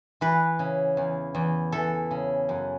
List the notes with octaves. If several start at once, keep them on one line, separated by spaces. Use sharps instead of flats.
E3 B4
C#3
E2
E2
E3 A4
C#3
F#2